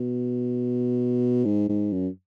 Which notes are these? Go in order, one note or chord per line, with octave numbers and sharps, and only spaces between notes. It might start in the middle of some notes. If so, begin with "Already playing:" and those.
Already playing: B2
G#2
G#2
F#2